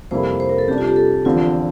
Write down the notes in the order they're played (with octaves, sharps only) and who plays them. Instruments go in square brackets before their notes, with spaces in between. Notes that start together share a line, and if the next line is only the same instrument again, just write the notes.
[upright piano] F2 C3 G3 A#3 E4 [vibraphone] C5
[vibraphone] C5
A#4
A4
[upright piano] C3 G3 D4 [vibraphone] G4
[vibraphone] F4
G4
A4
[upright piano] E2 D3 F3 C4 [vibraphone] F4